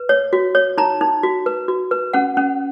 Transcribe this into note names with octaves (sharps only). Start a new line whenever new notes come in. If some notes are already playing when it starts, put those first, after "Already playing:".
Already playing: B4
C#5
F#4
C#5
D#4 A#5
D#4
F#4
B4
F#4
B4
C#4 F#5
C#4